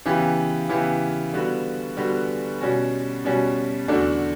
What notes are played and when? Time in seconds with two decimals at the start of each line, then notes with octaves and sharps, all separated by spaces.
0.05 C#3 E3 B3 E4 G4
0.69 C#3 E3 B3 E4 G4
1.33 D3 G3 B3 F#4
1.97 D3 G3 B3 F#4
2.61 B2 G3 C#4 F#4
3.25 B2 G3 C#4 F#4
3.88 E2 D3 A3 D4 F#4